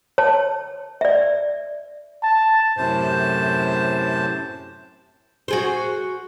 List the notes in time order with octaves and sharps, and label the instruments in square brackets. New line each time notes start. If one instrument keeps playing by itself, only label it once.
[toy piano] C#5 A5
D5 E5
[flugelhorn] A5
[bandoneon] F#2 A2 C3 C5 A5
[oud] F#4 G#4 C5